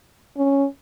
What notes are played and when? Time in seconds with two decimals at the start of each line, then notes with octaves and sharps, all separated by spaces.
0.37 C#4